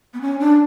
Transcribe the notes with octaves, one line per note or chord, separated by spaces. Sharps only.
B3
C#4
D4